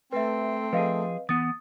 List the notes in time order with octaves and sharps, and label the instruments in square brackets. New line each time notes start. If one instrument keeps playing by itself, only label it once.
[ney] A3 [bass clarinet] C4 [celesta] B4 E5
[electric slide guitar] F3 G#4 [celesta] B4 D#5 F5
[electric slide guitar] E3 B3 [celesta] D#6 A6